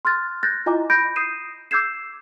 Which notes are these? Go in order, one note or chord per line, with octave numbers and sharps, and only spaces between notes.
C6 F6 F#6 A6
F#6 G6 A6 A#6
E4 F4 D#5 G#5 A#5 D6
B5 G6 A#6 D7
D#6 G6 C7 D#7 E7
D6 E6 G6 G#6 C7 E7